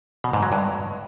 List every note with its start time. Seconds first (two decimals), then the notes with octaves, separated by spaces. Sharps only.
0.24 B2
0.33 G#2
0.43 F#3
0.52 G2